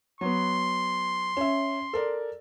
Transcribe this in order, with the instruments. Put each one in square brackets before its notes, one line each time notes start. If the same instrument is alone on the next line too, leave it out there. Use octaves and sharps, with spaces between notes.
[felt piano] F#3 B3 [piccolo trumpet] C6
[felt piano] C#4 E5
A4 A#4 D5